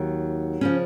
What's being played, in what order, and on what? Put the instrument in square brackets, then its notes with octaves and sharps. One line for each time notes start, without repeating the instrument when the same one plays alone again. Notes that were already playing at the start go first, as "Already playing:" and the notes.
Already playing: [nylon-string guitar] D#2 D#3 F#3
C#3 F3 C#4